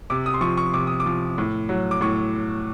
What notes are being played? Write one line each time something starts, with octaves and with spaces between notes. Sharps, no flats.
C3 D6
D#6
C6
F3 C#6
C#6
C3 D6
D#6
D6
F3
A2
F#3
D6
A2 C#6